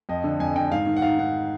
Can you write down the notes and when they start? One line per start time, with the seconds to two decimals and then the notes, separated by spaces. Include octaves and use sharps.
0.09 F2 D#5
0.24 D3
0.40 F2 G#5
0.56 D3 G5
0.71 G#2 F5
0.86 D#3
0.96 F#5
1.02 G#2 F5
1.18 D#3 F#5